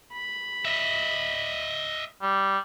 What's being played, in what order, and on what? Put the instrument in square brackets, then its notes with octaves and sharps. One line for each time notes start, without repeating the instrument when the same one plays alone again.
[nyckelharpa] B5
[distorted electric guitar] D#5 E5
[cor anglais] G3